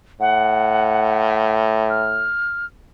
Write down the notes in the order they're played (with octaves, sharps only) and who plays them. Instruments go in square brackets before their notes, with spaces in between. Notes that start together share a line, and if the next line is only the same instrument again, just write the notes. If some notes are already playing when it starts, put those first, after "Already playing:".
[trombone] A2 [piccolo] F#5
[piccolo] F6